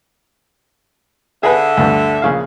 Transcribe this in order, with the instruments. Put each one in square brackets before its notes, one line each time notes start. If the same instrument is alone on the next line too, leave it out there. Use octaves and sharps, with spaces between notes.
[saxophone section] D3 E5 [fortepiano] G#4 B4
[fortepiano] D2 G2
A#1 C#3 F5